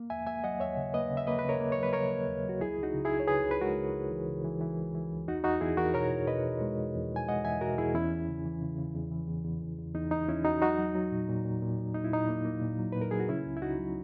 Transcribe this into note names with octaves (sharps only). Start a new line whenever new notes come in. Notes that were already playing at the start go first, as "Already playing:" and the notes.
Already playing: A#3
D#2 E5 G#5
A#3 E5 G#5
F#3 D#5 F#5
D#2 C#5 E5
C#3
A#3 B4 D#5
C#3
E5
A#3 B4 D#5
B4
C#3
A#4 C#5
A#3
C#5
F#3
B4
C#3 A#4 C#5
A#3
D#2
F#3 F#4
C#2 E4 G#4
C#2
D#4 F#4
C#3
E4 G#4
C#2
C#5
C#3 G#4 B4
C#2
B4
G#3 F#4 A#4
C#2
C#2
E3
C#3
E3
E3
C#2
E3
C#2
E2 D#4 F#4
E2 D#4 F#4
E2 E4 G#4
E2 F#4 A#4
B2 A#4 C#5
E2
B2 B4 D#5
E2
G#3
E2
E2
E2 G#5
G#3 D#5 F#5
E2 E5 G#5
B2 F#4 A#4
E2 E4 G#4
E2 C#4 E4
E2
C#3
E3
C#3
C#3
E2
E3
E2
E2
E2
E2
E2 D#4
E2 D#4
E2 C#4 E4
E2 D#4 F#4
F#3 D#4 F#4
F#3
F#3
A#2
A#2
A#2
A#2
A#2
A#3 D#4
E4
A#2 D#4
A#3
A#3
A#2
F#3
A#2 B4
A#4
F#3 G#4
F#4
C#3 C#4 E4
C#2
E4
C#2 D#4 F#4
F#3